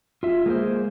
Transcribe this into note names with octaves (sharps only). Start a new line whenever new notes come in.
F4 E5
G#3 A#3 E4 C5